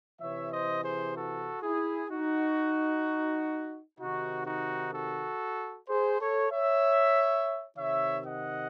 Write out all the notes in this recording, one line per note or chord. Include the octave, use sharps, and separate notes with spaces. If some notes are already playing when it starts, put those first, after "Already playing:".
C3 E3 C#5 E5
C5 D#5
G#4 C5
F#4 A4
E4 G#4
D#4 F#4
C3 D#3 D#4 F#4
D#4 F#4
F#4 A4
G#4 C5
A4 C#5
C#5 E5
C3 D#3 C#5 E5
D#5 F#5